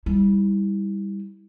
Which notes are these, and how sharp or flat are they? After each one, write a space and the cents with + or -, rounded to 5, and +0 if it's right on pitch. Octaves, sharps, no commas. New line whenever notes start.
G3 +15 E4 -25